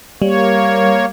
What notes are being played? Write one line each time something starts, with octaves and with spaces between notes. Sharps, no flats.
G3 A#3 C#5